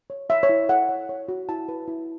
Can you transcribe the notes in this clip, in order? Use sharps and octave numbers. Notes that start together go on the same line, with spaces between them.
C#5
C#5 E5
C#5
E4
A4 F#5
C#5
C#5
F#4
E4 A5
B4
E4